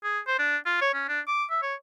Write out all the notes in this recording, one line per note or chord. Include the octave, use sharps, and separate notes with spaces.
G#4
C5
D4
F4
C#5
C#4
D4
D6
E5
C#5